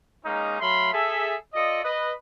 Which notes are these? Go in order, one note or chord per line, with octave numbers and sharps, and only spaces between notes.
G#3 A#3 C#4 D#4
F#3 A3 F5 B5 C6
G#4 A4 E5
F4 A4 D5 D#5
B4 D#5